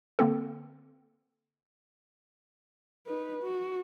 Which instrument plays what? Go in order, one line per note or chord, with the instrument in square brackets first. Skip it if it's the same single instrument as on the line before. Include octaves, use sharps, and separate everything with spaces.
[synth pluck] D3 A#3 C4 A4
[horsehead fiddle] D#4 B4
F#4